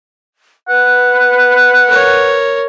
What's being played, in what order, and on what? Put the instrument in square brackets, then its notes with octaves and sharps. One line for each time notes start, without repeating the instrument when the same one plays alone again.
[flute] B4 [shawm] F#5
[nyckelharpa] A#4 C#5